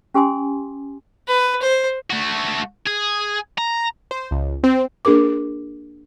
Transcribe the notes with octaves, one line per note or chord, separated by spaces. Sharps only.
C#4 G4 G#5 C6 D#6
B4
C5
A3 F#4
G#4
A#5
C5
C#2
C4
A#3 D4 G#4 A#4 D6